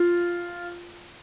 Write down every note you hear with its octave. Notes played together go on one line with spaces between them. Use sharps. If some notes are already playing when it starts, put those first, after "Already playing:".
Already playing: F4